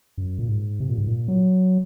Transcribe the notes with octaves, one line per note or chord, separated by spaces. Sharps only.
F#2
A#2
G#2
C3
A#2
G#2
A#2
F#3